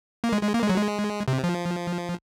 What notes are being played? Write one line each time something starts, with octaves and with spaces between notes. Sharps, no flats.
A#3
G#3
G#3
A#3
G#3
F#3
G#3
C3
F3